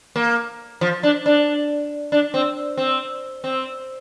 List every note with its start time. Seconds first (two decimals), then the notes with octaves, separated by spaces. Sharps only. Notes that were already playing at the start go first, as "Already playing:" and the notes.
0.16 A#3
0.81 F3
1.03 D4
1.26 D4
2.12 D4
2.34 C4
2.77 C4
3.44 C4